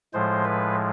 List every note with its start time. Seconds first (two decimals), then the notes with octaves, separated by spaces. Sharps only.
0.14 A2 F3 G#3 C5
0.44 B4